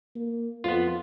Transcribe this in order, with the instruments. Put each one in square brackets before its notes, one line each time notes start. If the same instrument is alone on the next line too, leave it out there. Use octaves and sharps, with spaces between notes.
[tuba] A#3
[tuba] F2 [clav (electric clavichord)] B3 F4